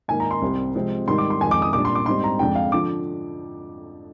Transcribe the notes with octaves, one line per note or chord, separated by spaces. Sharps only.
G#2 D#3 A#3 G#5
A#5
C6
C2 C3 G3 C4
C3 F3 G#3 C4
G#2 D#3 G3 C6
D6
C6
F2 D#3 G#3 G#5
D6
D#6
A#2 G3 D4 D6
C6
D6
G#2 G3 C4 C6
A#5
F2 D3 G#3 D4 G5
F5
D3 F3 D6